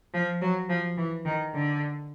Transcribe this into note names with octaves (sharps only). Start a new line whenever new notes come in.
F3
F#3
F3
E3
D#3
D3